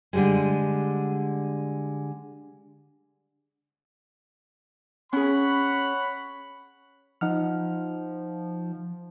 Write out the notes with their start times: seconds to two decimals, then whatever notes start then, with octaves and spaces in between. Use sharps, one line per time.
0.13 D3 G3 G#3
5.13 C#4 G#4 C#5 F#5 B5
7.21 F3 D#4 F#5 F6